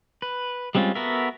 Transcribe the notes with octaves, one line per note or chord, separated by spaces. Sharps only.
B4
G3 G#3 C4 C#4 F4
B3 F#4 A4 A#4 E5